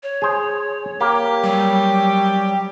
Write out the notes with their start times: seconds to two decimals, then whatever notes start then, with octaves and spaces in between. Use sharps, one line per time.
0.03 C#5
0.22 G#4 C5
1.01 A#3 G4
1.44 F#3 G3